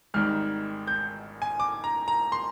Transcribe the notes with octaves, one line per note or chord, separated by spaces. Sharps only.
G#1 G#2 D#3 G3 F6
G6
G#5
D6
A#5
A#5
C6